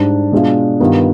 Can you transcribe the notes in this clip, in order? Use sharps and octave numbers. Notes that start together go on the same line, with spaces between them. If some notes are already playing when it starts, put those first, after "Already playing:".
Already playing: G#2 G3 D4
B2 G#3 D4 F4
G2 D#3 B3 F4